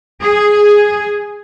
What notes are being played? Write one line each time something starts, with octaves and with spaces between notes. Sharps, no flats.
G#4